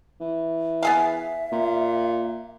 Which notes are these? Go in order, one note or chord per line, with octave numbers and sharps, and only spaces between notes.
E3
B3 G#4 E5 F5
A#2